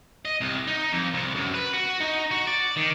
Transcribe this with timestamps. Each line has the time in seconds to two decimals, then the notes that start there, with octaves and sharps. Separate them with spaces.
0.25 D#5
0.41 C2
0.68 D#4
0.93 F2
1.14 C2
1.35 F#2
1.54 B4
1.73 F#4
2.01 D#4
2.31 F#4
2.47 D5
2.77 D#3